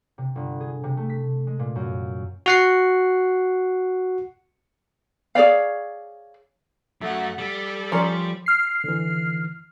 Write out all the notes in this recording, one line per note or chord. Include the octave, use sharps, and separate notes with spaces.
C3
G1
G#4
C3
A3
B6
G#3
A#2
F#2
F#4 F#5 C7
G#4 C#5 D5 F5
F#2 F#3 A3 F#5
G3 A4
F3 C#4 A#4 D5 C6 C#7
F6 C7
D3 E3